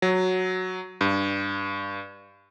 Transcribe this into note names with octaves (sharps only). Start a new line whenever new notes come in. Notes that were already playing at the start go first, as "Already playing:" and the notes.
F#3
G2